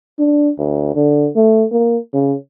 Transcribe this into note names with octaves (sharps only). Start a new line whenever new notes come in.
D4
D2
D3
A3
A#3
C#3